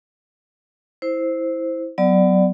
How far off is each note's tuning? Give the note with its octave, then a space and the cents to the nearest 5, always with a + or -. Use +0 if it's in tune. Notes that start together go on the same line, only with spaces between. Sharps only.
E4 -10 C5 +0
F#3 +10 B3 +30 D5 +10